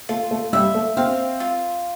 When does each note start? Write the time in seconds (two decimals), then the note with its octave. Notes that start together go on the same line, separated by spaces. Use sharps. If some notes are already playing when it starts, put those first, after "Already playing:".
0.09 A3 F4
0.31 A3
0.53 G3 E5
0.75 A3
0.97 C4 F5
1.40 F4